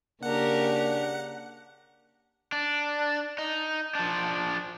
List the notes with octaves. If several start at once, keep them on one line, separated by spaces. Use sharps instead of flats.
C#3 A#3 D4 G4 A#4 F#5
D4
D#4
F3 D4